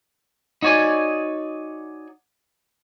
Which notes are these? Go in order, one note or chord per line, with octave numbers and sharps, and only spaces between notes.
D#4 F#4 C#5 D5 G#5